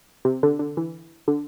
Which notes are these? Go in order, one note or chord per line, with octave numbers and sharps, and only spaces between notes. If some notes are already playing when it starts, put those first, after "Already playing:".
C3
D3
D3
E3
D3